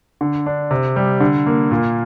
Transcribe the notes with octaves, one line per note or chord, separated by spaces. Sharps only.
D3
D4
C3
G3
D3
A#3
A#2